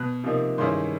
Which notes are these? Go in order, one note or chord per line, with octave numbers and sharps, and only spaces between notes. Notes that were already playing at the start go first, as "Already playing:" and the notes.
Already playing: B2 F#6
C3 F3 A#3 D#4
G2 D#3 G#3 C#4 E4 C6